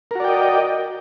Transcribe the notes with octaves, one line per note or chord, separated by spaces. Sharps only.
F#4 A#4 D5 D#5 G5